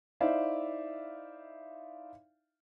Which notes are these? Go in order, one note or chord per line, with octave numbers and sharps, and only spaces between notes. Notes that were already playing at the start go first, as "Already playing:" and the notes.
D#4 E4 C5 D5 E5 F5